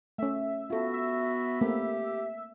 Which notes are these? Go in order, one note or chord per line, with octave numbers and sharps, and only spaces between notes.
A3 C#4 E5
B3 F4 F#4 A4
E5
A3 A#3 C4 G4